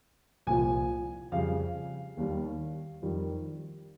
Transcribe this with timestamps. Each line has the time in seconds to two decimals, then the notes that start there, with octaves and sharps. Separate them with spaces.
0.47 C2 A#2 F3 G#5
1.32 F2 C#3 G3 F5
2.17 D#2 D#3 G3
3.02 F2 D#3 G3